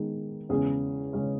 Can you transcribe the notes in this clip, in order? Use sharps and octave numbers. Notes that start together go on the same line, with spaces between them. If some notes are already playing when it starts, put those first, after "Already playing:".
Already playing: D#3 G#3 B3
E2 C#3 G#3 C#4 G#4
C#3 G#3 C#4